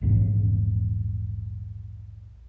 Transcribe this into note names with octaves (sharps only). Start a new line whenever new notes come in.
A#1 E2 G#2 C#3